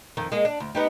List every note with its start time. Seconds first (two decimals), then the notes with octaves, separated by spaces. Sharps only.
0.17 F2 D#3
0.32 G#3 A#3 G#4
0.45 D4
0.60 D2
0.75 B3 D#4 G4